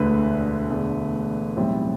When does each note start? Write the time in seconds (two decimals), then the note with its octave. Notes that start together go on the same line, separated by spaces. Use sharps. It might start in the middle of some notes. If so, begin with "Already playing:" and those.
Already playing: E1 D2 D3 A3 B4
0.69 E1 E2 D3 A3
1.57 B1 A2 E3 G3 C4